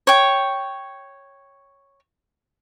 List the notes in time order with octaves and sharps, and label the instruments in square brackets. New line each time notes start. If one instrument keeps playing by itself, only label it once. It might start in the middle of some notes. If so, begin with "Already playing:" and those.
[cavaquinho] C#5 G5